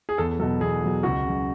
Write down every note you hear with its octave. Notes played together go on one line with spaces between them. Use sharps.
G#4
E2 A4
B2 F#3 A4
E2 G#4
B2 F#3
C#2 F#4
C#3 F#3